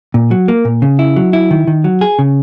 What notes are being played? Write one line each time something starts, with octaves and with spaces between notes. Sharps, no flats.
A#2
F#3
A#3
A#2
C#3
E4
F#3
E4
D#3
D#3
F#3
G#4
C#3